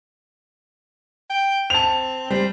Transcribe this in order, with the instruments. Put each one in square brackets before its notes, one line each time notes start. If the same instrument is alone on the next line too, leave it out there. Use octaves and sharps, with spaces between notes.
[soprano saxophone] G5
[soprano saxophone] C4 [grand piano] A5 F7
[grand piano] G3 [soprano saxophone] C5